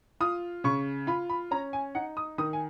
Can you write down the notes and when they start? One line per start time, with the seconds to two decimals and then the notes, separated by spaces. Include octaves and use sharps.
0.20 F4 D#6
0.64 C#3 C#6
1.07 F4 B5
1.29 B5
1.51 C#4 A#5
1.73 G#5
1.95 D#4 F#5
2.17 D#6
2.38 D#3 D#6
2.53 G#5